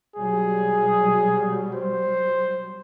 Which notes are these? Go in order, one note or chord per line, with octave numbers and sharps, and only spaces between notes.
B2 F#3 G3 G#4
C5